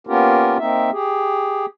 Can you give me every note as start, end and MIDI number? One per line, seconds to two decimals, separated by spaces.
0.07 0.58 58
0.07 0.58 59
0.07 0.58 61
0.07 0.58 65
0.07 0.58 67
0.07 0.58 70
0.58 0.90 58
0.58 0.90 60
0.58 0.90 63
0.58 0.90 76
0.91 1.66 67
0.91 1.66 68